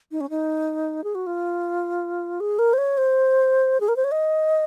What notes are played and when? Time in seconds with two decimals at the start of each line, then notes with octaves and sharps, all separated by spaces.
0.12 D#4
0.21 C#4
0.30 D#4
1.04 G#4
1.15 F#4
1.27 F4
2.40 G#4
2.59 A#4
2.73 C5
2.78 C#5
2.98 C5
3.80 G#4
3.88 A#4
3.96 C5
4.04 C#5
4.12 D#5